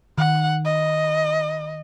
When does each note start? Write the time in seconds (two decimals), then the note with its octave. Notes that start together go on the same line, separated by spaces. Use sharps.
0.18 D#3 F#5
0.66 D#5